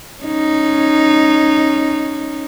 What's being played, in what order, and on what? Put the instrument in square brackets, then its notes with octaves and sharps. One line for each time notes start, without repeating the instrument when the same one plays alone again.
[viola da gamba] C#4 D#4